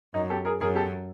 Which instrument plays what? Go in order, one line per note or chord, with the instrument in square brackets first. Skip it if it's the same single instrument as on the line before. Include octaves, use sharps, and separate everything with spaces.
[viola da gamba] F#2 [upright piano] D#4
[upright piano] G4 A4
G#4 A#4
[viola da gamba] F#2 [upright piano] G#4 A#4
[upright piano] G4 A4